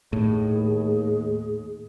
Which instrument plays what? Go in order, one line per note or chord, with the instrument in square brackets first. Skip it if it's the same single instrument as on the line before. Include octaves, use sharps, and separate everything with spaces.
[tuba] D#2 [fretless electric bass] A2 [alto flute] G#4